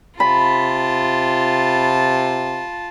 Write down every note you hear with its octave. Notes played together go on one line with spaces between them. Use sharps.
C3 F4 A5 B5